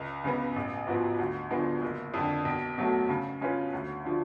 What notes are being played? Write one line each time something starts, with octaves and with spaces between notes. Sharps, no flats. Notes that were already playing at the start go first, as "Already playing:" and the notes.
Already playing: C#2
C#3 G#3 B3
A1
G#2 F3 B3 F#4
D2
D3 F3 G#3 B3
F#1
F2 D3
B1
B2 F#3 A3
C#3
G#3 C#4 F4 B4
D2
D3 F3